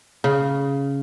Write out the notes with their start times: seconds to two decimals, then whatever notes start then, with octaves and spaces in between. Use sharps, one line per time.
0.24 C#3